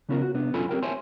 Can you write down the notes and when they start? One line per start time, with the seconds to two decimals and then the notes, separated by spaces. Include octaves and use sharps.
0.09 C#3 B3 C#4 F4 A4 A#4
0.22 F#4
0.34 C3 B3 D4
0.54 F#2 C#4 F4 A4 G#5 B5
0.69 C4 G4 A#4 G5
0.83 C5 C#5 E5 G#5 A5 C6